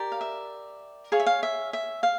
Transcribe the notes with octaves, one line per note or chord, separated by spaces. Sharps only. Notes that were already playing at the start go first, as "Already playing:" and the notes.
Already playing: G4 A#4 D5
F5
E5
G#4 C#5 F5
E5
F5
E5
E5
F5